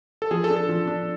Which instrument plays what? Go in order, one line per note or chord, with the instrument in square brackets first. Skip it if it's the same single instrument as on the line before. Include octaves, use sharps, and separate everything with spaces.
[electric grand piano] A4
[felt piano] F3 [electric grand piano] G#4
[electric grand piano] A4
[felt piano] D4
[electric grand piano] A4
[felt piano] F3
D4